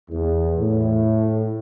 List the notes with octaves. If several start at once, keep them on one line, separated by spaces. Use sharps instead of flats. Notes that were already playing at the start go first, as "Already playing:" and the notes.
E2
A2